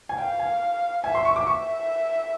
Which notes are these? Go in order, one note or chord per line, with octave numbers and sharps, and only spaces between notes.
G#5
F5 G5
G#5
E5 G#5
C6
C#6
D6
E5 C#6